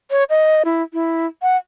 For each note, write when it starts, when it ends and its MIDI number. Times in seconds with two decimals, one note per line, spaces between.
0.11 0.24 73
0.30 0.63 75
0.65 0.82 64
0.93 1.26 64
1.42 1.57 78